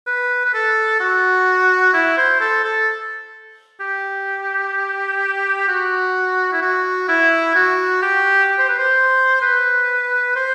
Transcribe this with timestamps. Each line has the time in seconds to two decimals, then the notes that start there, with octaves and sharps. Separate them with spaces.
0.07 B4
0.45 B4
0.54 A4
1.00 F#4
1.93 E4
2.18 C5
2.41 A4
2.64 A4
3.80 G4
5.68 F#4
6.52 E4
6.62 F#4
7.09 E4
7.55 F#4
8.02 G4
8.59 C5
8.69 B4
8.78 C5
9.42 B4
10.36 C5